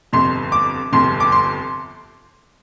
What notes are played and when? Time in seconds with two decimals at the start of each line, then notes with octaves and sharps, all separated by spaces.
0.13 G1 F2 C3 C6
0.52 D6
0.92 G1 F2 C3 C6
1.20 D6
1.32 C6